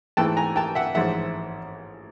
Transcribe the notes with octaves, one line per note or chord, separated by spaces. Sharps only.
G#2 E3 A3 G5 A5
G#5 A#5
G5 A5
E5 F#5
A1 G#2 F3 E5 F#5